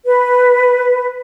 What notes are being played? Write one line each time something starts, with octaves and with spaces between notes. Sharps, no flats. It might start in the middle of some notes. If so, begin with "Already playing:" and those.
B4